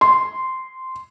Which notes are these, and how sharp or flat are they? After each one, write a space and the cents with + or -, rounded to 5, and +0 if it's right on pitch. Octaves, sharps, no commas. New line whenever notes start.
C6 -10